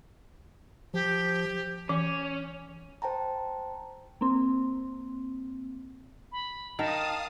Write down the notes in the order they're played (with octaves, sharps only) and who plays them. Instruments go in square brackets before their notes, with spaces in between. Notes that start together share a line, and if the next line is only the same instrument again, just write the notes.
[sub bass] F3 [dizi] G4
[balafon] E3 [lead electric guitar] C#4
[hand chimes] C5 G5 A5 A#5
[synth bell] A#3 C4
[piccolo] B5
[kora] D#3 A#4 [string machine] F5 D#6 [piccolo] A5